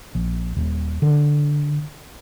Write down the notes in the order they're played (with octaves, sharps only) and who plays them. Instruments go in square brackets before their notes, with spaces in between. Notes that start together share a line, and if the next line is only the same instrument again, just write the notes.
[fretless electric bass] A#1
D#1
D3